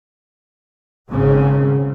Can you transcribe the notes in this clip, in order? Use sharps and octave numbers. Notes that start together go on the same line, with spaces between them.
G#1 G#2 C#3 C4